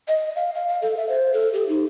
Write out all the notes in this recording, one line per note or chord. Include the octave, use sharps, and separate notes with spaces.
D#5
F5
F5
F5
A4
E5
C5
A4
G4
D#4